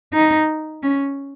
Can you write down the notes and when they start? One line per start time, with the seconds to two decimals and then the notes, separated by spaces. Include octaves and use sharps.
0.13 D#4
0.83 C#4